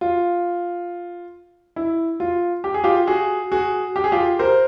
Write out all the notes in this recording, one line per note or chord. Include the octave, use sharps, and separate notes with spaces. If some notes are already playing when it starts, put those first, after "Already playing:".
F4
E4
F4
G4
G#4
F4 G4
F#4 G#4
F#4 G#4
G4
G#4
F4 G4
A#4 C5